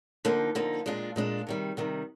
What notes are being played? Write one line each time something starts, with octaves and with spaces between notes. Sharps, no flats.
D3 F3 A#3 D#4
D3 F3 A#3 D#4
A#2 G#3 D4 F4
A#2 G#3 D4 F4
C3 D#3 G3
C3 D#3 G3